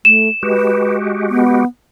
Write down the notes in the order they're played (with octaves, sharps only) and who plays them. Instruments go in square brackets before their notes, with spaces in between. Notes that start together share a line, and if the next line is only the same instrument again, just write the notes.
[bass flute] A3 [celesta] E7
[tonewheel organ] G#3 F#4 G4 [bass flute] B4
[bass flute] B3